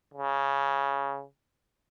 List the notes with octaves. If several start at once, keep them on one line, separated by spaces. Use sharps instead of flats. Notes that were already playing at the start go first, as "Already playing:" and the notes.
C#3